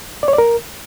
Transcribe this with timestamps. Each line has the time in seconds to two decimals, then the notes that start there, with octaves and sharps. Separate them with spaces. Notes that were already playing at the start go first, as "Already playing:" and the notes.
0.23 D5
0.28 C#5
0.33 D5
0.38 A#4